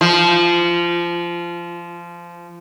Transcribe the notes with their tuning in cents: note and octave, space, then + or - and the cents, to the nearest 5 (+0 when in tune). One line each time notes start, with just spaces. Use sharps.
F3 -20